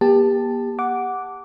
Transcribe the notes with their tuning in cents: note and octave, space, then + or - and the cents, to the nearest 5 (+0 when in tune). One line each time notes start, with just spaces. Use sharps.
A#3 +45 G4 +25 A5 +0
F#5 +0 D6 -10